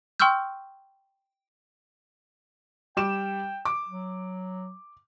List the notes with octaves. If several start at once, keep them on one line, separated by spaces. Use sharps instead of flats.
G5 C6 C#6 E6 F6 G6
G3 G5 D6 E7
D6
F#3